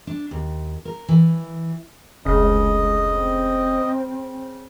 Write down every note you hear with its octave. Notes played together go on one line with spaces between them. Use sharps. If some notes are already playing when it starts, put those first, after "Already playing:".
D4
D#2
A#4
E3
F1 C#2 C#3 G#3 D#5
C4